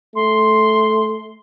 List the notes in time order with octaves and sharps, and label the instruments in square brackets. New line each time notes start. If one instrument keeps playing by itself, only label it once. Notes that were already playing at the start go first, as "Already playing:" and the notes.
[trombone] A3 [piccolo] C6